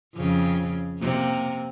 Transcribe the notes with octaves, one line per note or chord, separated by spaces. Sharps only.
F2 C#3
C3 A#3